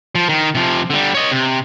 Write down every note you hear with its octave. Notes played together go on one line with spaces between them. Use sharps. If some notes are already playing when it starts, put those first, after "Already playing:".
F3
D#3
C3 F3
D3 G3
C#5 D#5
C3